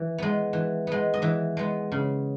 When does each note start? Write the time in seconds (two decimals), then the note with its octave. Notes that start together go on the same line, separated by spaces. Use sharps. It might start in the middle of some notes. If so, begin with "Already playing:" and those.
Already playing: E3
0.18 G#3 B3
0.53 E3
0.87 G#3 B3
1.14 D#5
1.22 E3 E5
1.57 G#3 B3
1.92 C#3